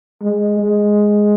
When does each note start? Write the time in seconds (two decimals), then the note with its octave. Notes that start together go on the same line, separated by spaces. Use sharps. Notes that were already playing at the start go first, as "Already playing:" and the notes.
0.22 G#3
0.60 G#3